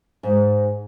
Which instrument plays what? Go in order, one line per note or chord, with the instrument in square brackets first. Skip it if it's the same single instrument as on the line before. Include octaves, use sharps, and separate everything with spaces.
[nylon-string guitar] G#2